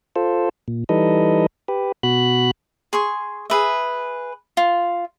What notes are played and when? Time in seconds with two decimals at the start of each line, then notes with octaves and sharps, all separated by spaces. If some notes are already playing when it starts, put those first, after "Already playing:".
0.16 F4 A4 C5
0.68 A#2
0.89 E3 G3 D#4 A4 B4 D#5
1.68 G4 B4
2.03 B2 F#4 B5 F#6
2.93 G#4 C6 C#6
3.50 G#4 B4 E5
4.57 F4